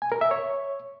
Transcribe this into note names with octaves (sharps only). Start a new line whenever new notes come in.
G#5
A#4
E5
C#5